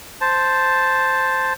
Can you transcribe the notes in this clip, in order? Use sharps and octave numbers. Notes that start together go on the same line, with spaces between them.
C5 A5